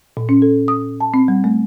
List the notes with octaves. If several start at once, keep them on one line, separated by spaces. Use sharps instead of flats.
A#2
C#4
A4
D#6
A5
C4
G3
A3